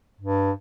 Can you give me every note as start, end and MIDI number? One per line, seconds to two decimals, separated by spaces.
0.21 0.51 43